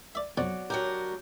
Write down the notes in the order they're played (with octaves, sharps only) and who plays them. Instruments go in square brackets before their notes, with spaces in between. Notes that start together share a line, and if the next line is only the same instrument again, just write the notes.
[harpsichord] D5 E5
[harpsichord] B1 F2 F3 [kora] F#4 C#5 D5
[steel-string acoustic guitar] F#3 D4 A#4 [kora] G4